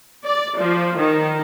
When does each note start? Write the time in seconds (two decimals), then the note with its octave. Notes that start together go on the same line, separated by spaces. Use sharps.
0.24 D5
0.57 F3
0.97 D#3